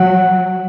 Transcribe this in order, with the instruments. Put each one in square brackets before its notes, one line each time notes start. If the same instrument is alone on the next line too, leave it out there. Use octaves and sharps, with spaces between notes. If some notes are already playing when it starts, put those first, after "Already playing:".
Already playing: [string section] F#3 [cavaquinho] F#5